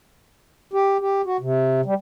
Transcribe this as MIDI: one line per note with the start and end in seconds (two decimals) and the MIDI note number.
0.73 0.97 67
1.01 1.22 67
1.26 1.37 66
1.40 1.81 48
1.86 1.94 55